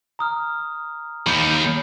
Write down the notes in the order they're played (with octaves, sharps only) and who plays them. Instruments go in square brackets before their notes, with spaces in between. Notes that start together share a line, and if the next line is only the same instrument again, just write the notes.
[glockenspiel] A#5 D#6 F6
[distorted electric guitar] D#2 [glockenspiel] B5 G6